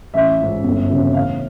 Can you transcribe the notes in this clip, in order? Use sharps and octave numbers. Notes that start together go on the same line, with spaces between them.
A1 E5
G#2 F3
G1
F2 C#3 F#3
A1 F5